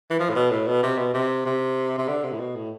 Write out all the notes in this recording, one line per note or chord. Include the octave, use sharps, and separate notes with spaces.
E3
F3
A2
B2
A2
B2
C3
B2
C3
C3
C3
D3
C3
A2
B2
A2